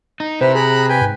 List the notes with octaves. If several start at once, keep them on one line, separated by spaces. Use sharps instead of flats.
D#4
C3 E4 B4 C5
G#4 A#5 B5 F#6
B4 G5 G#5
G#2